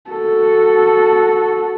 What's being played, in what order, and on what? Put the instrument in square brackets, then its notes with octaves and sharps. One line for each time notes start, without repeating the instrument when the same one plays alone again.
[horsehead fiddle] F#4 A4